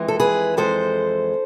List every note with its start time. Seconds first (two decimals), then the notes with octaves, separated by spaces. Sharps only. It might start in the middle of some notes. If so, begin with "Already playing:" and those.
Already playing: F2 E3 G#3
0.08 A4
0.20 G#4 B4
0.57 F2 E3 G#3 A4 C5